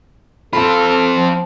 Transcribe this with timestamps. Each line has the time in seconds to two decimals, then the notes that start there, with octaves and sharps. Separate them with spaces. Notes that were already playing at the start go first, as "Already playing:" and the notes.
0.53 C4 F4 A4 B5
1.15 F3